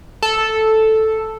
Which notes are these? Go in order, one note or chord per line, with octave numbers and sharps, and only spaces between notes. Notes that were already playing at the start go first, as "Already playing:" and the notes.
A4